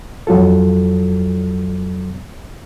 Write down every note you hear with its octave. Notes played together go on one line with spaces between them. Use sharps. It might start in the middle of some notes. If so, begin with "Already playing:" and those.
F2 F#3 F4 A4